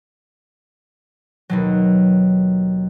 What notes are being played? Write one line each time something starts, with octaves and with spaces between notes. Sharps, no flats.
D#2 B2 F#3